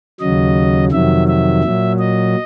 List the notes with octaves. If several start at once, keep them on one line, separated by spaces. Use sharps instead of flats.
D#2 C#3 F#3 D#5
F2 C3 D#3 F#3 E5
E5
A#2 F#3
D#5